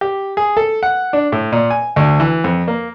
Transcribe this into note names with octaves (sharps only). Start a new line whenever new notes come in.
G4
G#4
A4
F#5
D4
A2
A#2
G#5
D2
E3
F2
A#3